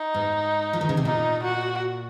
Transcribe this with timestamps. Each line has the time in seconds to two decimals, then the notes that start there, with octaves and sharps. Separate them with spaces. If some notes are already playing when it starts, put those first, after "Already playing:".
Already playing: D#4
0.14 G#2
0.73 F3
0.81 D#3
0.89 C#3
0.97 C3
1.05 A#2 D#4
1.44 F#4